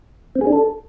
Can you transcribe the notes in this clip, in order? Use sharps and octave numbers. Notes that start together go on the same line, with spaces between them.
C4
G#4
D4
A4